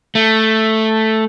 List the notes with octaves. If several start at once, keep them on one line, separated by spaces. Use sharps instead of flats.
A3